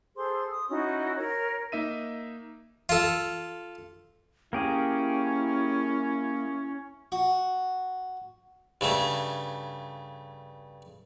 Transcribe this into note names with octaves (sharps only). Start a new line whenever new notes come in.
G#4 A4 C5 C6
D#6
C#4 D#4 E4 F#4
A#4 C#5
A#3 D#4 E5 D#7
F4 A4
A#3 C#4 E4 G4 G#4
F#4
G2 C#3 A3